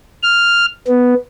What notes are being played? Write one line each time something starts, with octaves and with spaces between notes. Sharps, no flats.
F6
B3